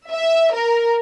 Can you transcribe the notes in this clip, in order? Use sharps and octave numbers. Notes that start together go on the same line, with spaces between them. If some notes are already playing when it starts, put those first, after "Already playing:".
E5
A#4